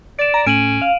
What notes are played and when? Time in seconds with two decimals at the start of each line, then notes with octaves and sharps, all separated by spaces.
0.19 D5 D7 E7
0.34 A#5
0.47 A2 C#4 D7 D#7 F#7
0.82 F5